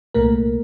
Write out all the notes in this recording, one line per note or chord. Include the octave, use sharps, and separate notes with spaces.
C2 A#2 A3 A#3 A#4